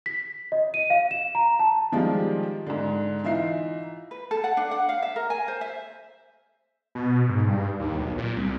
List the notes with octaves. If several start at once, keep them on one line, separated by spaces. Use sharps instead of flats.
B6
D#5
D#7
F5
E7
A#5
A5
D#3 F3 G3 G#3 F4
G#2 D3
E3 D#4 F4 E5 C7
B4
A4
F#5
D4
F#5
F5
E5
A#4
G#5
C5
E5
B2
G#2
G2
D#2
B1
A#2
C2